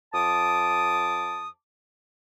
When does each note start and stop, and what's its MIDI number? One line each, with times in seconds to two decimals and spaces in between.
0.13 1.48 41
0.13 1.48 81
0.13 1.48 86
0.13 1.48 87